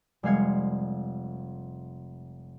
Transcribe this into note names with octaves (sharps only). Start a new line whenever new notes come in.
F1 G3 G#3 F5 G#6 C#7